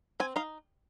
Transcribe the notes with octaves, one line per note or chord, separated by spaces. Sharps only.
C4 G#5
D#4 F5